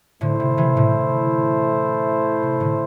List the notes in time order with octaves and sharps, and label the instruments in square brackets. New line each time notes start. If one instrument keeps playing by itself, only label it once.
[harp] A2 D3 [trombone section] A3 E4 C5
[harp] C3
C3 E3
A2 D3
C3
A2 D3